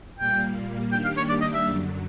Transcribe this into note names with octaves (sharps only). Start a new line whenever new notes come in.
A#2 G3 A#3 G5
D#3 G3 A#3 D4 G4 G5
F5
C#5
D5
D#5
E5
F#2 D3 F#3